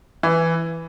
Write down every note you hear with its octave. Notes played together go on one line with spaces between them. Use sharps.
E3